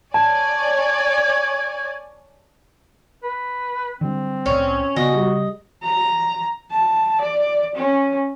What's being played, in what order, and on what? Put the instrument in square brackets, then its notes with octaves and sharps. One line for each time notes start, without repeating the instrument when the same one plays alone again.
[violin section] C#5 D5 G#5 [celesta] A5 [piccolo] G#6
[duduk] B4
[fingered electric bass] D3 F#3 G3 [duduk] C4
[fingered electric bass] C2 A2 [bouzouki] C#4
[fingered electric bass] C#3 [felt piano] B3 G#5 [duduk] F#4 [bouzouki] D#5
[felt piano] G3 G4 G#4
[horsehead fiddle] A#5
A5
D5
C#4